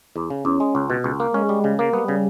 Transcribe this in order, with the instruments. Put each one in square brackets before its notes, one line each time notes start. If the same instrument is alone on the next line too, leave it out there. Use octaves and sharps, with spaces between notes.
[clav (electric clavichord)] E2
C#3
[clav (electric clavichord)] E2 [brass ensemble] C#4
[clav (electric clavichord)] G#3
C#2
B2
C#2
A#3
[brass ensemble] G#3 [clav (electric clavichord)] C#4
[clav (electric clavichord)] G3
C#3
A#3
[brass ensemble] G3 [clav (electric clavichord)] B3
[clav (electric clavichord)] C#3